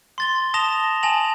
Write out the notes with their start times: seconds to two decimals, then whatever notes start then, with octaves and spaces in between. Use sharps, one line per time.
0.18 C6 A6 G7
0.54 A5 D#6 A#6 E7 F7 G7
1.03 G#5 A5 A#6 F7 F#7